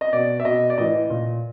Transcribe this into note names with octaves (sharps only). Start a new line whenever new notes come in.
D#5
B2 D5
E5
B2 D#5
D5
A2 E3 D#5
A#2